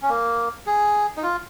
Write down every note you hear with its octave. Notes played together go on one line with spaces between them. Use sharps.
C#4
A#3
G#4
D#4
F4